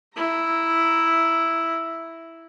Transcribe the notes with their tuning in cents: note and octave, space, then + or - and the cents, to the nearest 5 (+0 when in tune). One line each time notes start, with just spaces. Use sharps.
E4 +0 A#5 +10